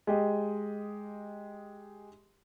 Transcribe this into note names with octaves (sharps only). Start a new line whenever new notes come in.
G#3 G4 D#5